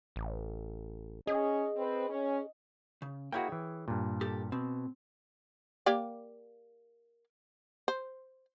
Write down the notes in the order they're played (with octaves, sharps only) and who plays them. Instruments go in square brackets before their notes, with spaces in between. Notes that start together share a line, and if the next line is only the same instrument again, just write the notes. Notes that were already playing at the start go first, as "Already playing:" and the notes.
[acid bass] A1
[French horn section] C#4 [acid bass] G#4 [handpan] D#5
[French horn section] C4 B4
C#4
[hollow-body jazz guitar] C#3
[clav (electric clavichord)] A#3 E4 F#4 [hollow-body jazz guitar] G#4 C#5 G5
[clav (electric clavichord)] E3
G2 A#2
[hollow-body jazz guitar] G4 A4
[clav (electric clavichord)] B2 [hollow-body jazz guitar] C4
[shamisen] A#3 G4 D5
C5